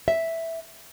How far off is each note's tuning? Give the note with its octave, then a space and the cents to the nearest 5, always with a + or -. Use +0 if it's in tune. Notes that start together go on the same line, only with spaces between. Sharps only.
E5 +0